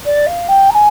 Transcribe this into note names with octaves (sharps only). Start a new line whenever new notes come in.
D5
F5
G5
A#5
G#5